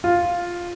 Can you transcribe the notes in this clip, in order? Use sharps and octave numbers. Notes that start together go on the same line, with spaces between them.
F4